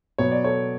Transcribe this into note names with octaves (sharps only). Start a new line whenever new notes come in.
B2 F#3 B3 C#5
D5
A4 C#5